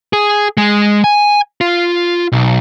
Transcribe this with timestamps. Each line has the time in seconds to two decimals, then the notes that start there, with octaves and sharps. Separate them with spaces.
0.13 G#4
0.57 G#3
1.04 G#5
1.61 F4
2.32 B1